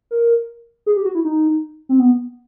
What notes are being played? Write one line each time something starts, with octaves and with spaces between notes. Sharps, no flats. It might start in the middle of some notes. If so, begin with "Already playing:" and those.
A#4
G#4
G4
F#4
E4
D#4
C4
B3